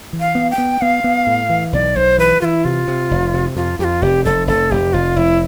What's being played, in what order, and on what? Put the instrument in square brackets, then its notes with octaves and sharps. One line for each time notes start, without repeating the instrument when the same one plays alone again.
[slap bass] E3
[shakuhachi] F5
[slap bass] B3
[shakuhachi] G5
[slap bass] B3
[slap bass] B3 [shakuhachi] F5
[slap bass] B3
A2
E3
[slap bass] B1 [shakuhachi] D5
[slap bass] B1 [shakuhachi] C5
[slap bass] E3 [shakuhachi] B4
[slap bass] E3 [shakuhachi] E4 F4
[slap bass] C3 [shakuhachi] F4
[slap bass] C3
F1
C3
[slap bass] F2 [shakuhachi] F4
[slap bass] F2 [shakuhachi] G4
[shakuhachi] F4
[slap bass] F1 [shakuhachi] G4
[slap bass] F1 [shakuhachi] A4
[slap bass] F1 [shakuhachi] A4
[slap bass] F1 [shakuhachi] G4
[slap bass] F1 [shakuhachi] F4
[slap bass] F1 [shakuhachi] E4